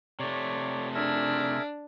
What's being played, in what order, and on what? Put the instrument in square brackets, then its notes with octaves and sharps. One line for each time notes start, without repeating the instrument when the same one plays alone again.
[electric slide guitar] C3 A3 [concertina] C#5 D5
[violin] D4 [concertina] G#4 A#4 E5